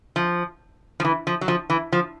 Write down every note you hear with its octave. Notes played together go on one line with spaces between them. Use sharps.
F3
F3
E3
F3
F#3
F3
E3
F3